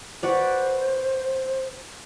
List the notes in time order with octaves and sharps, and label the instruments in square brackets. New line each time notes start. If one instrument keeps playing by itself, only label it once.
[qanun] F#4 B4 D5 [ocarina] C5